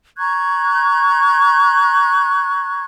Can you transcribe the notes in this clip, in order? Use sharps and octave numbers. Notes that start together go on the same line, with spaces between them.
A#5 C#6 F#6 G#6